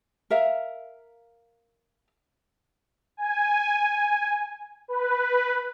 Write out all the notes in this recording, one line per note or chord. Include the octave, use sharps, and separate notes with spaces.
A#4 E5 F5
G#5
B4